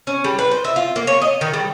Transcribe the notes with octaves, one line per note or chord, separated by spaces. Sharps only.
C#4
G3
B4
C5
E5
F4
A#3
C#5
D#5
D#3
G3